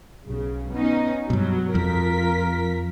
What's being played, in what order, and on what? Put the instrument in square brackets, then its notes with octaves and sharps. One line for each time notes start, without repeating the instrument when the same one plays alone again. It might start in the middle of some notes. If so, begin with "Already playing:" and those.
[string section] B1 C#3
B3 C#4 D#4
[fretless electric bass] G2 B2 [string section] F#3
[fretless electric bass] F2 [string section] F4 A#4 B6